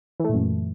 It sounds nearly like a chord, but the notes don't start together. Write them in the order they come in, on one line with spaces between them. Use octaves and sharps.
E3 A3 A#2 F#2